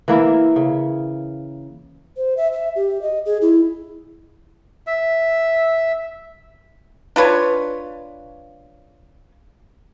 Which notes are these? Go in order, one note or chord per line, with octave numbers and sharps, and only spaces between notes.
E3 A#3 E4 A#4
C#3
C5
E5
E5
G4
D#5
G#4
E4
E5
D4 F4 B4 C#5